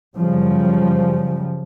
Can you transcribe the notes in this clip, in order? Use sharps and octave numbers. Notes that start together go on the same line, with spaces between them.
F#2 C#3 F3 G3